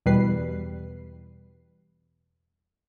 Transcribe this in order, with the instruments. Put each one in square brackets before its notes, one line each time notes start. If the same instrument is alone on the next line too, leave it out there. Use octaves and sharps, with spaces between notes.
[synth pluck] E2 B2 G3 B4 C7